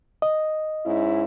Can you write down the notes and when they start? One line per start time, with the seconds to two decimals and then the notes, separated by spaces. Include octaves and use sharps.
0.22 D#5
0.85 G#2 C#4 E4